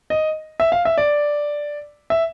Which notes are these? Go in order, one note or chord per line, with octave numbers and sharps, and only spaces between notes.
D#5
E5
F5
E5
D5
E5